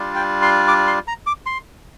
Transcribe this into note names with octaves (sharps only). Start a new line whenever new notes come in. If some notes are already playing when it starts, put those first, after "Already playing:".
Already playing: G3 D4 F4
G5
C6
D6
C6
A#5
D6
C6